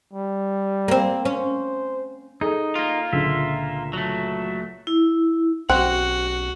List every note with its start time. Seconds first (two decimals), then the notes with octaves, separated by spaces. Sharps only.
0.13 G3
0.88 A#3 C4
1.25 C#4 C5
2.41 D#4 G#4 A4
2.75 A#3 F4
3.13 C#2 A#2 D3 E5
3.93 F#3 A3
4.87 E4
5.69 B1 C4 C#4 F#4 F#5